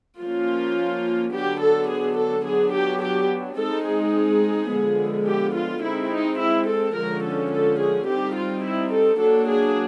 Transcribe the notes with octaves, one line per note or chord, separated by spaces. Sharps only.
F3 A#3 C#4 F4
D3 F#3 B3 D4 G4
A4
G#4
A4
F#3 B3 D4 G#4
G4
G4
G#3 C4 D#4 A4
G#4
D3 F3 G#3 B3
G4
F4
G#3 C4 D#4 E4
D#4
E4
A4
D3 F3 G#3 C#4 A#4
A4
A4
G#4
G3 C4 D#4 G4
F4
E4
A4
F#3 A#3 D4 A4
G#4